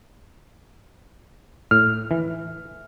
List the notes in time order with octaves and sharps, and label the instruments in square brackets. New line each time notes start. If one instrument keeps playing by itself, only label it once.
[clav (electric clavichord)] A2 [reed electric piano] F6
[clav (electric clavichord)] E3